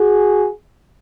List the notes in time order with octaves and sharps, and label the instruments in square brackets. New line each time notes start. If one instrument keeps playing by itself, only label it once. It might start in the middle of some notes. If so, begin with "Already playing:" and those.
Already playing: [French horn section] F#4 G#4